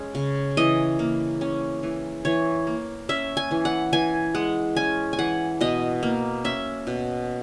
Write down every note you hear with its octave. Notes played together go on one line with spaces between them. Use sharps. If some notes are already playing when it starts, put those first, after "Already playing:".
Already playing: G#3 C#4
C#3
E3 D#5
A#3
C#4
E3
E3 C#5
A#3
C#4 E5
G#5
E3
F#5
E3 G#5
G#3 F#5
C#4 G#5
G#5
E3 F#5
B2 D#5
A#3
C#4 E5
B2